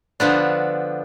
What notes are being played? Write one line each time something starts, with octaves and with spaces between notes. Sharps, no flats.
D3 F3 B3 D4